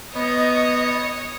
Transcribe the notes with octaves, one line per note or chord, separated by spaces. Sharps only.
B3 C#5 D#5 D#6